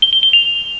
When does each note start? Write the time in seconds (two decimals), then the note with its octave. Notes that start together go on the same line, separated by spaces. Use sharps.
0.02 G7
0.13 G7
0.23 G7
0.33 F7